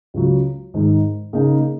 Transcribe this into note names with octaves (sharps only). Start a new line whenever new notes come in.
C#2 C#3 F#3
G#2 D#3 G#3 D#4
C#3 A#3 D#4 G#4